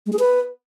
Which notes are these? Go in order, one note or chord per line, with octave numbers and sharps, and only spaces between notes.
G#3
G#4
B4